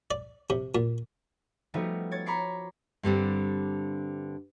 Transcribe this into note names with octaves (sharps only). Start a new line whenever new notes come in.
D5
C3
A#2
F3 G3 A3 B3 D#4 F#4
C#5 G#6 A6
A#5 B5 C#6 D6 C7
G2 D3 G3 C4